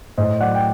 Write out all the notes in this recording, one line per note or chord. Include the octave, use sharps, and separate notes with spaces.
A2 C5 D#5
F#3 D5 F#5
G5